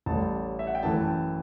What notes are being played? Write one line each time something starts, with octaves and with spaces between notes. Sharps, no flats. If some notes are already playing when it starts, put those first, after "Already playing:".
A1 A2 G3 A5
E5
F#5
G5
F#2 E3 A3 A5
G5